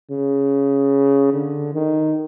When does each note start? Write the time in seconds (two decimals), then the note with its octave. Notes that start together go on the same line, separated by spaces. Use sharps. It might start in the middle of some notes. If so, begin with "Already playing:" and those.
0.11 C#3
1.33 D3
1.74 D#3